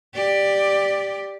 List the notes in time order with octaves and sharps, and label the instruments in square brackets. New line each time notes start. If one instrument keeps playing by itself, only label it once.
[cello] G4 D5